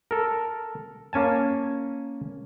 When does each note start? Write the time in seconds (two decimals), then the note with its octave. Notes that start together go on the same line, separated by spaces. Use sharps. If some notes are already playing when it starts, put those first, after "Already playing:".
0.11 A4 A#4
1.13 A#3 C#4 G#5 A5